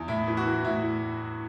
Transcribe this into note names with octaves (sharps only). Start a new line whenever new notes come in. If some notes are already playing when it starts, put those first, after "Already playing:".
Already playing: E2
A2 E4
E3
F#4
E3
A2 E4